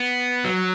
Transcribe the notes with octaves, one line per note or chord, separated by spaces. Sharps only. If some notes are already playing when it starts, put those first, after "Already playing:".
Already playing: B3
F#3